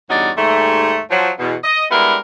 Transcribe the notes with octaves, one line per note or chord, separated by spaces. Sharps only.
E2 G2 C#4 D#4 F#4 D5
D#2 G#2 G3 A3
F3 F#3
E2 B2
D#5
G3 G#3 B3 D4 E4 A#4